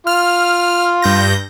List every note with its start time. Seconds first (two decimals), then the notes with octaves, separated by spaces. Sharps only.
0.07 F4 F6
1.02 G2 G6 A#6